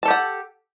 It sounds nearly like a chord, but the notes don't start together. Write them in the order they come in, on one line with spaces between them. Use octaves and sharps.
A5 A4 G4 F#5